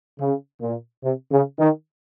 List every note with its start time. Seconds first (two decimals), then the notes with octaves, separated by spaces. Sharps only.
0.18 C#3
0.61 A#2
1.03 C3
1.31 C#3
1.59 D#3